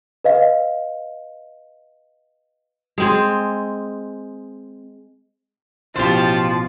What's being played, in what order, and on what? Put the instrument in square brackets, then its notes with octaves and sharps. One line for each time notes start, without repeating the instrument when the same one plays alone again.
[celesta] B4 D#5 F5
[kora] G#3 C4 G#4
[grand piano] A1 B2 [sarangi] F3 [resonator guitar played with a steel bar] G4 C5 [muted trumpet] A5